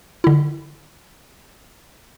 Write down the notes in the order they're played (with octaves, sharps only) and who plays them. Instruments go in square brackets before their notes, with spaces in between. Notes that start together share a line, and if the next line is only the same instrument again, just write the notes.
[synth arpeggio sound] D3 E4